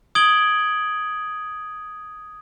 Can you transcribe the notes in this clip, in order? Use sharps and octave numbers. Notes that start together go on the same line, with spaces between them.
D#6 G#6 D7 F#7 G7